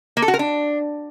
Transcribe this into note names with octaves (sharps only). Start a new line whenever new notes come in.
A#3
A4
F#4
A#4
D4